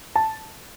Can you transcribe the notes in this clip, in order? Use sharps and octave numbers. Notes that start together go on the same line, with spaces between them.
A5